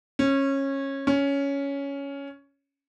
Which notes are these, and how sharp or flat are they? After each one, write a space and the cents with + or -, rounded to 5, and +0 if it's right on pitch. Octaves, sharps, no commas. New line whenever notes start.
C#4 -20
C#4 +10